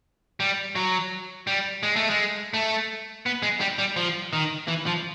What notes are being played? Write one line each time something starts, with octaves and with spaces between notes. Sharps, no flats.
G3
F#3
G3
G#3
A3
G#3
A3
B3
G#3
G3
G3
F3
D#3
E3
F3